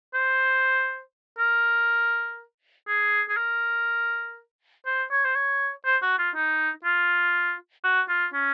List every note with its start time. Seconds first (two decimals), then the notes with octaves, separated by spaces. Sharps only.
0.14 C5
1.39 A#4
2.88 G#4
3.29 G#4
3.37 A#4
4.86 C5
5.11 C#5
5.25 C5
5.36 C#5
5.85 C5
6.02 F#4
6.19 F4
6.36 D#4
6.84 F4
7.84 F#4
8.09 F4
8.34 C#4